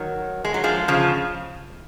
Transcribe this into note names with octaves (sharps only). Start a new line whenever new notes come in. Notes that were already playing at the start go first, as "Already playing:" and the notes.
Already playing: D#3 F#3
G#3
F#3
F3 G#3
C#3 F3